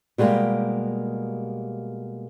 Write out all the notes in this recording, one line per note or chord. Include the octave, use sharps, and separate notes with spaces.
B2 G3 G#3 A#3 G4